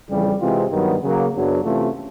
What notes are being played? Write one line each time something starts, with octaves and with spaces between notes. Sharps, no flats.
F2 C#3 E3 G3
C3 E3 G#3 C4 F4
G2 D#3 F#3 B3
C#3 F#3 A#3
F#2 C#3 F#3 B3 D4
C3 E3 A3 C#4 F4